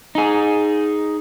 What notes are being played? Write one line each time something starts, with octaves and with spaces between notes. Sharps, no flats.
D#4 G#4